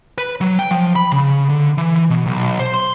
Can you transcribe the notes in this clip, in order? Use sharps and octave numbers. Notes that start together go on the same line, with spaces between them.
B4
F#3
G5
F3
B5
C#3
D3
E3
B2
B1
C5
C6